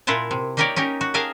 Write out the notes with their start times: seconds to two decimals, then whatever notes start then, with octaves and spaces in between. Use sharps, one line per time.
0.07 A#2 E4 F4 F#5 A5
0.31 C3
0.57 A#3 D#4 G4 A#4 C#5 D5
0.76 C#4 D#4 G4 A#4
1.01 F#4
1.14 G4 G#4 A#4 F5 A5